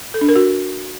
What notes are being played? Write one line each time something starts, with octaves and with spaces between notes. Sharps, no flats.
A4
D4
A#4
F#4